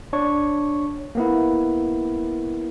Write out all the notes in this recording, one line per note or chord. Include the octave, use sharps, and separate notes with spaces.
D4 C#5 C#6
A#3 B3 E4